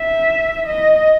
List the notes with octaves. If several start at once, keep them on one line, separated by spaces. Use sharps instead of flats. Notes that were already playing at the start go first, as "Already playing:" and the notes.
Already playing: E5
D#5